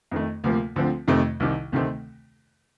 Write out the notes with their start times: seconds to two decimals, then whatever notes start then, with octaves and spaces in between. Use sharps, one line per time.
0.11 F2 D#3 A3
0.44 D2 C3 F3 A#3
0.76 D2 D3 F3 C4
1.08 F2 C3 D#3 A3
1.40 C2 C3 D#3
1.72 D2 C3 D#3 A3 C4